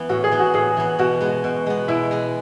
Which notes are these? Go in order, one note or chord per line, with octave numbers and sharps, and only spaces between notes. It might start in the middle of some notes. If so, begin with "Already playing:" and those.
Already playing: E3 B3
A2 F#4
G#4
E3 B3
F#4
A2 G#4
E3 B3
B2 F#4
G#3 B3
B2
G#3 B3
B2 E4
G#3 B3